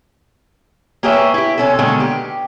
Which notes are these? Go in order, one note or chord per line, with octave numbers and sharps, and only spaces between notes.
A#3 G4 G#4 B4 C#5 E5
E4 G4
C3 C#4 A4
B2 D3 D#3 G#3 A#3
G4